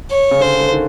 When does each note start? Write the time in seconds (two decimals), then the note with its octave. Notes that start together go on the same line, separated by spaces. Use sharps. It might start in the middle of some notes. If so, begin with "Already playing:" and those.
0.10 C#5
0.31 C#3
0.41 D3 C5
0.61 D3
0.72 D#3